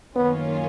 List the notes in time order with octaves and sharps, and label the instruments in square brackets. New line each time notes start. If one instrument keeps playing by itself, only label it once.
[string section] F#2 D#3 A#3 C#4 F4 [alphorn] B3